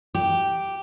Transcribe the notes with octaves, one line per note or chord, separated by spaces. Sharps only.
G4